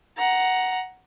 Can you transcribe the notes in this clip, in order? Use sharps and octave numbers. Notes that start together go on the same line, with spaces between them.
F#5 A#5